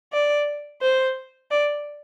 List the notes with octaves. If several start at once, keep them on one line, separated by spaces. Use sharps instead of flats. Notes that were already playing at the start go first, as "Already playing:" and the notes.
D5
C5
D5